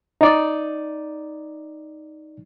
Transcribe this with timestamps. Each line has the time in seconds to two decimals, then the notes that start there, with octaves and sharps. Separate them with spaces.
0.21 D#4 D5